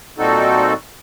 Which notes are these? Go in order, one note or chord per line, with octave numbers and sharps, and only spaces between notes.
A#2 G3 C4 D#4 F#4 A4